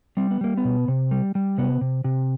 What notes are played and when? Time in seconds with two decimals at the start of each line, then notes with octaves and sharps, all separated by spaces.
0.17 G3 C4
0.31 B3
0.41 G3 A#3
0.57 B3
0.65 B2
0.88 C3
1.11 G3
1.35 G3
1.58 C3 B3
1.81 C3
2.04 C3